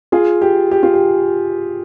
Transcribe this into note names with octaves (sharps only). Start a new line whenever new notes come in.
F4 G#4
G4
G4
F4
G4